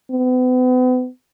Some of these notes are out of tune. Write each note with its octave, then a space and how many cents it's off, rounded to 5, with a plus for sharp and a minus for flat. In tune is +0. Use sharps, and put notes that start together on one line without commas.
B3 +40